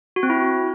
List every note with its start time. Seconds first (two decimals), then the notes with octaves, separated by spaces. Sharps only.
0.16 F#4
0.23 C4
0.30 E4